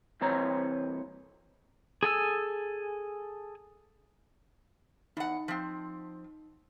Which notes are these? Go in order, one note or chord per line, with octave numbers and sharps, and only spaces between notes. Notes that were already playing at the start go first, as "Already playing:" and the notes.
C2 E3 C4 B4 C#5 A#5
G#4 A4 G#5 E6
E2 D#4 F#5
F3 C4